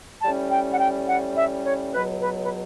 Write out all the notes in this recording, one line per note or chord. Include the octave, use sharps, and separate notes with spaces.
A2 G3 C#4 A5
G5
F#5
G5
F#5
E5
C#5
C#2 B2 F#3 B4
B4
B4